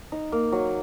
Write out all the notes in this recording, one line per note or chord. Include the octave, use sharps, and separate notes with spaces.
D#4
A#3
F#3